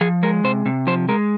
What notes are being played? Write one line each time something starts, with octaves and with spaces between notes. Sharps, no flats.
F3 G#4
G#3 A#4
C3 C5
C3
F3 C5
G#3 A#4